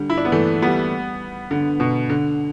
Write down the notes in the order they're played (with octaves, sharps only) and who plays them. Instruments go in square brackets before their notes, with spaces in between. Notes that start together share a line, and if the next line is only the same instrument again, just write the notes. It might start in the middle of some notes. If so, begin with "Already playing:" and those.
Already playing: [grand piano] D3 G3
E4
D4
B3
E3 A3
G3 B3
D3
B2
D3